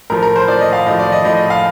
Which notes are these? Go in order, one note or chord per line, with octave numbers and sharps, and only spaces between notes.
A2 F3 A#4
A#4
C5
A2 F3 D5
D#5
F5
A2 F3 D#5
D5
D#5
A2 F3 D#5
D#5
F5